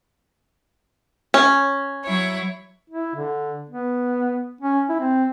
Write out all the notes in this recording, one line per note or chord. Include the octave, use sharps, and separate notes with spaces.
C#4
F#3 E4 C#5
E4
D3
B3
C#4
E4
C4